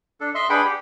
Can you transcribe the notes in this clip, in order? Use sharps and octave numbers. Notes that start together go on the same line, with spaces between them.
D4 A4
D#5 E5 C6
D4 G#4 B4 F#5 G5 B5
G4